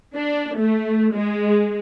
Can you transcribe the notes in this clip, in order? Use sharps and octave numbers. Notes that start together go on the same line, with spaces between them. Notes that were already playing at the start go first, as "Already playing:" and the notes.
D4
A3
G#3